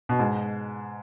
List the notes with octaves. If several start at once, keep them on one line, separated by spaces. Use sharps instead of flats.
B2
G#2